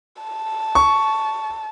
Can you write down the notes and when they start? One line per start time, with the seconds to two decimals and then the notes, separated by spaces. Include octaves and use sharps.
0.23 A5
0.75 C#6